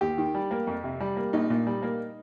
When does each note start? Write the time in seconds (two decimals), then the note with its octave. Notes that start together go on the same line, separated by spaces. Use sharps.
0.01 D#2 G4
0.18 D#3
0.35 G3
0.51 A#3
0.67 F2
0.84 C3
1.00 G3
1.16 A#3
1.33 A#1 D#4
1.50 A#2
1.67 G3
1.82 A#3